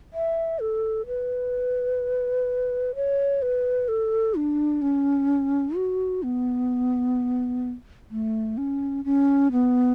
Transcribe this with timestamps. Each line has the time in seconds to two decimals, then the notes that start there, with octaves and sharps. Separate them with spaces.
0.13 E5
0.60 A4
1.07 B4
2.95 C#5
3.42 B4
3.88 A4
4.35 D4
4.82 C#4
5.76 F#4
6.23 B3
8.11 A3
8.57 C#4
9.05 C#4
9.52 B3